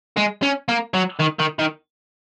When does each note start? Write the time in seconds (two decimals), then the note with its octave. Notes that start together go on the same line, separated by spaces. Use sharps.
0.17 G#3
0.43 C#4
0.69 A#3
0.94 F#3
1.19 D#3
1.39 D#3
1.59 D#3